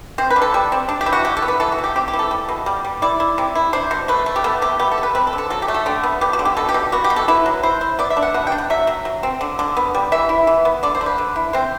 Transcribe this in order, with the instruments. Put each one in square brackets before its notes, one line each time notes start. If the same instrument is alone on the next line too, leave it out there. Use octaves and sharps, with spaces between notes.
[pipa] C4 C5
B4
D3
A4
G3
C4
D4
G4
E3
F#4
E3 G4
A4
B3
B4
E3 A4
F#4
E3
G4
C4 G4
G4
E3
A4
G3
B2
G3
G3
E4 D5
E4
C3
E4
D4 C5
B2
A3 B4
A3
G4
B3 A4
C3 G4
B3 G4
A4
G3
B4
C4 B4
A4
D3
A4
F#3 A4
G4
A3
A4
D3 G4
B3
B3 G4
F#4
D3
G4
B2 A4
G4
B2
B3 F#4
G4
B2
A4
E4 B4
F#3
E4 C5
E4
B3 D5
E5
D4
F#5
B2 F#5
G5
D4
F#5
F#3 E5
F#3
F#3
C4
D3
D3
B3
G3
E3 E5
E4
E3
B3
D3 D5
C5
D3
B4
D3
E4
C4 C5